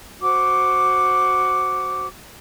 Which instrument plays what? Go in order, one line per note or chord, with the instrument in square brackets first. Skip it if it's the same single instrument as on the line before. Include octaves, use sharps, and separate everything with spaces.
[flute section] F#4 C5 D6